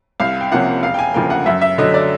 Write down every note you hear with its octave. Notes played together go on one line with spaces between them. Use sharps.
C2 F5
G5
C3 F3 A#3 C#4 F#5
E1 F5
G5
G#5
D2 C#3 F3 A#3 G5
F#5
F#2 E5
E5
D3 F#3 D#5
D5